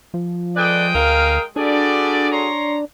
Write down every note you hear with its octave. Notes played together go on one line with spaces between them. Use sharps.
F3
G#3 A4 B4 D5 G5 D#6
D2 A#4 F5
G3 D4 F#4 G#4 A4 D5
C#5 A#5 C6